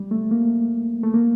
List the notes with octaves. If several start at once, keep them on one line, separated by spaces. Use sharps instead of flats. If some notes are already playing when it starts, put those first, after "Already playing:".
Already playing: G3
A3
A#3
A3
A#3